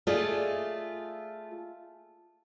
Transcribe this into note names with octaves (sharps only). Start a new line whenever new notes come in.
A3 F4 G#4 D5 D#5